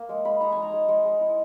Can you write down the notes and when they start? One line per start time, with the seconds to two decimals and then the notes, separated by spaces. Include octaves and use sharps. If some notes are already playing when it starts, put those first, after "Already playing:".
Already playing: A#3
0.09 G#3
0.25 G#3 B5
0.41 D#4 A#5
0.52 G#3 G#5
0.62 A#5
0.73 G#3
0.88 G#3
1.05 G#3
1.21 E4